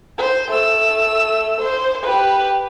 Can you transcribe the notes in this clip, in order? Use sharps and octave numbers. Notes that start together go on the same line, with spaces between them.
C5
A3 E6
C5
G4 B4